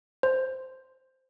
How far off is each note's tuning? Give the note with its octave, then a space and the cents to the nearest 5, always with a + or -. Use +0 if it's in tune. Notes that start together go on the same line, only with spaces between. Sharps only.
C5 -5